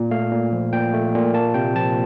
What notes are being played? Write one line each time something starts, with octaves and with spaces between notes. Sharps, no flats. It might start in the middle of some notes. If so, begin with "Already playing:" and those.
Already playing: A#2
A3 F5
A#2
F3
A#2 G5
A3
A#2
A#3 A5
C3 G5
F3 A5